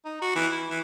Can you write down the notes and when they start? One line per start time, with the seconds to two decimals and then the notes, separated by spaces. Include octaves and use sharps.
0.05 D#4
0.22 F#4
0.36 E3
0.52 E4
0.70 E3